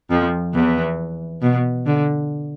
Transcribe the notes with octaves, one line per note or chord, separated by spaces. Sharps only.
F2 F3
E2 E3
B2
D3